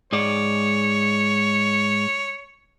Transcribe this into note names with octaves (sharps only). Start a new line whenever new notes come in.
G#2 G#3 C#5 D5